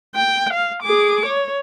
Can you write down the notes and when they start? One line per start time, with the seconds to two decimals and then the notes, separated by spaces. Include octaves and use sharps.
0.15 G5
0.53 F5
0.83 G#4 D6
1.26 C#5